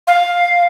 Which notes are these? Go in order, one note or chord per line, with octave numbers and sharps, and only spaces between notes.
F5